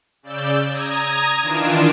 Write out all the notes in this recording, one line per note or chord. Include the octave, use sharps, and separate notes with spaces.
C#3 D5 E6 G6
A#5 D#6 G#6
D#3 E3 D4 F4 D7 E7